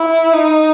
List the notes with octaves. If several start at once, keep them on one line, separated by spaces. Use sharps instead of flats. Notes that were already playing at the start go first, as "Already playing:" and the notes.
Already playing: E4
D#4